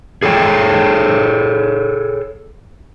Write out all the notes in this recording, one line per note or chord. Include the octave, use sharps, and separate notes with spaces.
G#4 A4 C#5 G5